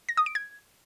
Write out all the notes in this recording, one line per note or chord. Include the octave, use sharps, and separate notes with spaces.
A#6
D#6
D7
G#6